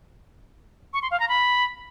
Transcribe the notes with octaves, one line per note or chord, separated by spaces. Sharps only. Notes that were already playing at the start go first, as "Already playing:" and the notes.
C#6
C6
F5
A#5
B5